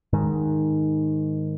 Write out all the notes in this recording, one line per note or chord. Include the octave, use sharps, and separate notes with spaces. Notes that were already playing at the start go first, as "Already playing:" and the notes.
G#2 D#3